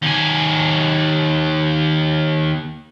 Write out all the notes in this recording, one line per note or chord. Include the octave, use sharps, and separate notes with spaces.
D#2 G#5